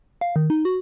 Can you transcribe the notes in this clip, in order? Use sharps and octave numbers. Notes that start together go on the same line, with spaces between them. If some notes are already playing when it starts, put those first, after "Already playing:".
F5
D#3
D#4
F#4